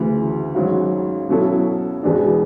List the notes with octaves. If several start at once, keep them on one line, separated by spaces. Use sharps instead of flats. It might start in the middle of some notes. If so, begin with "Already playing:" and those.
Already playing: D2 C#3 E3
G#1 G#2 F#3 C#4
B2 F#3 C#4 E4 A4
E1 E2 B2 G#3 D4